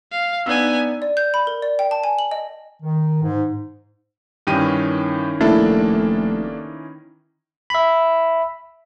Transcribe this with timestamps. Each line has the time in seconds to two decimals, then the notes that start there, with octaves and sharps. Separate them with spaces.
0.12 F5
0.46 B3 D4 D#4 G#5 E6
1.02 D5
1.17 G6
1.34 B5
1.47 A#4
1.62 D5
1.79 G5
1.91 A5
2.04 G#5
2.19 F#7
2.31 D#5
2.82 D#3
3.22 G#2
4.47 G2 D#3 E3 C#4 G4 D#7
5.41 F1 A#3 D4 E4 A4
7.70 E5 B5